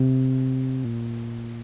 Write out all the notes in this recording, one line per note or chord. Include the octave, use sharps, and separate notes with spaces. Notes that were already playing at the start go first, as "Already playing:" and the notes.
Already playing: C3
A#2